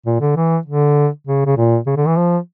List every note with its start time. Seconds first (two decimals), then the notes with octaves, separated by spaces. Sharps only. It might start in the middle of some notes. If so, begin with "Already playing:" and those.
0.06 A#2
0.21 D3
0.36 E3
0.66 D3
1.27 C#3
1.46 C#3
1.57 A#2
1.87 C#3
1.97 D3
2.07 E3
2.17 F3